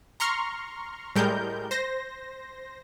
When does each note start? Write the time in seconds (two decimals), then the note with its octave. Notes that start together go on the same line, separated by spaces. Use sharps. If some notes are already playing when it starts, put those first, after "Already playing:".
0.20 A#5 C6 C#6 F6
1.16 A2 G3 G#3 A#4 G6
1.71 C5 A#6